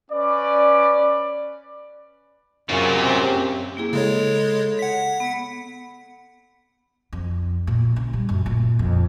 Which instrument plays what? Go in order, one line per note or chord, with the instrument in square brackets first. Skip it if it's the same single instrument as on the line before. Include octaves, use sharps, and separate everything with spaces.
[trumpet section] C#4 B4 D5
[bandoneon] F#2 [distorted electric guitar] A#2 [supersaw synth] C4 G4 [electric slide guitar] C#4 F4 G#4
[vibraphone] A#3 E4 G#4
[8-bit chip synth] C#3 G#3 C#5 [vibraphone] A4
[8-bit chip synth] F#5 B6
[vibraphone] B3
[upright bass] F2
A#2
C#3
G3
F#2
A#2
F2